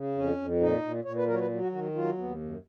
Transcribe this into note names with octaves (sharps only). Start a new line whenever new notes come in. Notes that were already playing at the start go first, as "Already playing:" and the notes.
Already playing: C#3
F2 C#4
F2
A#2 D#4
A#2
A#2 C#5
B4
F#3 A#4
C#5
B4
F#3
F#4
D#3 F#4
F#3 F4
D#2 B3
F#2